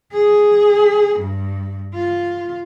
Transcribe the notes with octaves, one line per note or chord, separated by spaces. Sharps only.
G#4
G2
F4